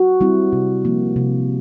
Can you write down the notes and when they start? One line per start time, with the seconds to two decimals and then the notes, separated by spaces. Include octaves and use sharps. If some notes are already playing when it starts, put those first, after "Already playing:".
Already playing: F#4
0.21 G3 C4 E4
0.53 C3
0.85 F3 A#3
1.16 C3